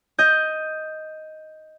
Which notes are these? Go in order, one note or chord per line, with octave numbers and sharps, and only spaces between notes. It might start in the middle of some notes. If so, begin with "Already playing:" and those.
D#5 G6